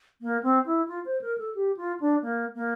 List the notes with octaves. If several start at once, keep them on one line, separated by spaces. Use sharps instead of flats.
A#3
C4
E4
F4
C5
A#4
A4
G4
F4
D4
A#3
A#3